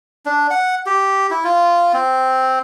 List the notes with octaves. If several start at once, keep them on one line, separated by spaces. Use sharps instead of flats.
D4
F#5
G4
E4
F4
C4